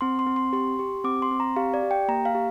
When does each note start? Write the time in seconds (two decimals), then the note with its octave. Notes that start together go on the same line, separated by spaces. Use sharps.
0.01 C4 C6
0.19 C6
0.27 C4
0.36 C6
0.53 G4 C6
0.79 G4
1.04 C4 D6
1.22 C6
1.31 C4
1.40 A#5
1.56 G4 F5
1.74 D5
1.83 G4
1.91 G5
2.08 A#3 A#5
2.25 F5
2.35 G4